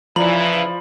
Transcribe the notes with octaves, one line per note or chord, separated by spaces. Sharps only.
C#3 E3 F3 D5 A#5 B5 F#7